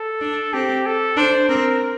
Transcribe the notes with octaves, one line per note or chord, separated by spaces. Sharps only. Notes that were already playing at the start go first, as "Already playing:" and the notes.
Already playing: A4
D4
C4 G4
A4
D4 C5
C4 A#4